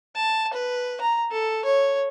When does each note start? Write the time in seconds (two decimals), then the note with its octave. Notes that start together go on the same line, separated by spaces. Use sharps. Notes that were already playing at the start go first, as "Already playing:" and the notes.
0.16 A5
0.54 B4
1.01 A#5
1.31 A4
1.65 C#5